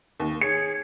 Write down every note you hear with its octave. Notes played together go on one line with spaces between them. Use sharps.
D#2
G#4 C#5 G#6 C#7